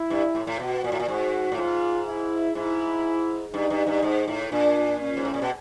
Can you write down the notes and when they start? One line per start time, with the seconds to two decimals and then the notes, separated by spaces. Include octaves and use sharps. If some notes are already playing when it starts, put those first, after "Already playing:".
Already playing: E4
0.10 G2
0.35 A2
0.47 A2
0.59 B2 F#4
0.84 A#2
0.92 A2
1.00 A#2
1.08 G#2 F#4
1.52 A2
1.57 G#2 F4
2.07 E4
2.55 G#2 E4
3.54 G2 D#4
3.70 G2
3.87 G2
4.03 G#2
4.28 A2
4.52 A#2 D4
5.00 C#4
5.17 G#2
5.25 A2
5.34 A#2
5.42 B2